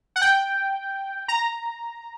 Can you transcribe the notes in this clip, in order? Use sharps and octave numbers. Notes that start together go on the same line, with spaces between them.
F#5
G5
A#5